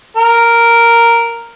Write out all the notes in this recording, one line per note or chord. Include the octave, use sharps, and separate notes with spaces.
A#4